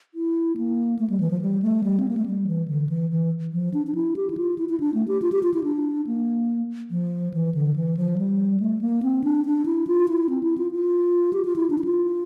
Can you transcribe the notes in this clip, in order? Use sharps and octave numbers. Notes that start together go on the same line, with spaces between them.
E4
A#3
A3
G3
E3
F3
G3
A3
G3
C4
A#3
A3
G3
E3
D3
E3
E3
F3
D4
D4
E4
G4
E4
F4
E4
E4
D4
A3
G4
F4
G4
F4
E4
D4
A#3
F3
E3
D3
E3
F3
G3
A3
A#3
C4
D4
D4
E4
F4
E4
C4
E4
F4
F4
G4
F4
E4
D4
E4
F4